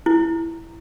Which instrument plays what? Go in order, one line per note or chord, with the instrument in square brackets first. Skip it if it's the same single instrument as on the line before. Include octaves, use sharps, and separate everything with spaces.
[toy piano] E4